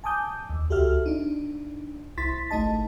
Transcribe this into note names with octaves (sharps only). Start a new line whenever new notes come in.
G#5 A5 D6 D#6 G6
D#2
C#2 F#4 G4 A4 E5 F6
D4 D#4
C2 E4 C6 A6 B6
G#1 A3 D#4 D#5 A5